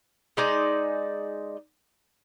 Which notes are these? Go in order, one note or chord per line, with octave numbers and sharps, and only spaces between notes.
G#3 D#4 D5